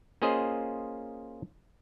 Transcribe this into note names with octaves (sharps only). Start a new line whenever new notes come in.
A#3 C#4 F4 G#4 C5 D#5